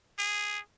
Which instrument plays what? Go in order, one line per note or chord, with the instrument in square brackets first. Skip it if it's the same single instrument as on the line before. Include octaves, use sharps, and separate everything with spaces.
[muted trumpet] G#4